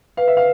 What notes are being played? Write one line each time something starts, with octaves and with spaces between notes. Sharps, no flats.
B4 F5
E5
F5